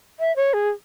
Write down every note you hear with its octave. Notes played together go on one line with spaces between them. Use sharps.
E5
C#5
G#4